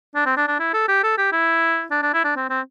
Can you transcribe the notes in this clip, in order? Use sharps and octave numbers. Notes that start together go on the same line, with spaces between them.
D4
C4
D4
D4
E4
A4
G4
A4
G4
E4
D4
D4
E4
D4
C4
C4